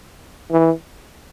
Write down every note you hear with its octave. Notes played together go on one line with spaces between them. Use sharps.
E3